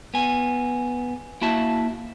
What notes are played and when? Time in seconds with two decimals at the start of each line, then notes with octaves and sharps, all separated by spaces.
0.14 B3 G#5
1.41 A#3 E4 F#4 E5 A5